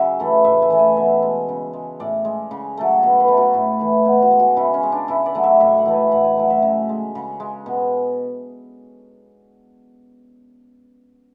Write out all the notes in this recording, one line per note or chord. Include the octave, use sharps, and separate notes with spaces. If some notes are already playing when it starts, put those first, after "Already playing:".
Already playing: C#3 F#3 E5
E3 A3
A2 E5
G#5
E3 A3
G#5
B2 E5
G#3
C#3
G#3
A2 D5
G#3
C#3
F#3 A3
B2 C#5
B4
A3
F#4
A2 E4
E3 A3
B2 F#4
F#4
G#3
F#4
C#3 E4
C#4
G#3
D4
C#3 E4
D5
F#3 A3
E5
A2 E5
F#5
E3 A3
G#5
A2 F#5
G#5
F#3 A3
E5
C#3
G#3
C#3
G#3
B2